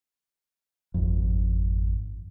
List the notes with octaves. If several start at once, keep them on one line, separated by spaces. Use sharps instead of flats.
G#1 F2